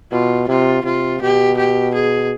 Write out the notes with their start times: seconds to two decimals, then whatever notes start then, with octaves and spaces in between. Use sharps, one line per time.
0.12 B2 F4
0.48 C3 F4
0.84 C3 F4
1.21 B2 G4
1.58 G4
1.94 G#4